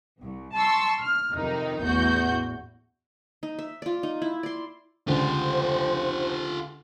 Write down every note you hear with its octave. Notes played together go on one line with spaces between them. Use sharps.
C2
A5 C6 C#6 E6
F6
F2 C3 D#3 D#4
A1 E2 F#4 G6
D#4
E5
F4 D5
D#4
E4
D5 C6
C#2 D3 F4 G4 C5